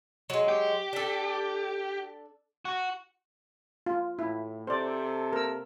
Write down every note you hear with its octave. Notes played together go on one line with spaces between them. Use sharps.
F#3 G#3
G4
D4 A4
F#4
F4
A2 E4
C3 A4 C5 D5
A#4 E6